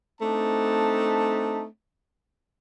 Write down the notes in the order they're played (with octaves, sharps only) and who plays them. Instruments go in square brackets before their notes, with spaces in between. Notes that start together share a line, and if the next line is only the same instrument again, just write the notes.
[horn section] A3 C4 D4 D#4 A5